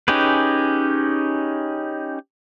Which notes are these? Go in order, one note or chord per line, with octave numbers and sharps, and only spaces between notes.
C#4 D#4 G4 G#4 B4